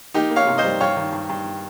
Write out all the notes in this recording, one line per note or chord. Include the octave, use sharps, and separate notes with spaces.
A#3 D#4 G4
A#3
C#5 F5
C3
C5 D#5
G3
G2 C#5 F5
D#3
G2
G2